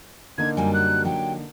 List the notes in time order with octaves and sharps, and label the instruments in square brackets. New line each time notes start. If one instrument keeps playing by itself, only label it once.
[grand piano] D3 A#3 D#4 [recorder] G#6
[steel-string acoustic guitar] F#2 F#3 G3 [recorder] G#5
[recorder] F#6
[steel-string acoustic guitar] F#3 D4 G4 [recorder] G5